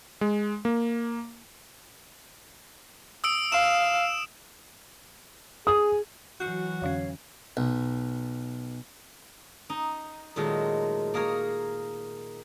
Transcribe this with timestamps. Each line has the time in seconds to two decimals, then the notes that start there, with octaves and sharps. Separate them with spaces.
0.21 G#3
0.65 A#3
3.24 D#6 E6 D7
3.52 F5 E7
5.67 G#4 D#6
6.40 E3 F#3 F#4 G6 C7 C#7
6.82 F2 D3 C#4 C#5 F5
7.57 B1
9.70 D#4
10.36 A#2 D#3 F#3 G#3 A3
11.14 A#3 G#4 A#4 C#5